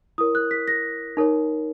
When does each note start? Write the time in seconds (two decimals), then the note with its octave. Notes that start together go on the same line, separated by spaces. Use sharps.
0.18 E4 A#4 C#5 D#6
0.35 F#6
0.51 B6
0.68 A#6
1.17 D#4 A#4 C#5